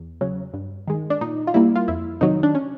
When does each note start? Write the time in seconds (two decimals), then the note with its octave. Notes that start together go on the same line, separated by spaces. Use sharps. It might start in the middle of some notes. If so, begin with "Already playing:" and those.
Already playing: E2
0.21 C#3 F#3
0.54 G2
0.88 D#3 G#3
1.10 D4
1.21 A#2 D#4
1.47 F4
1.54 G3 A#3 E4
1.76 F4
1.88 F2 E4
2.21 C3 D#3 F#3 D#4
2.43 D4
2.55 C#4